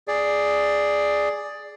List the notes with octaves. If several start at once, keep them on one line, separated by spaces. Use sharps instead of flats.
G#4 D5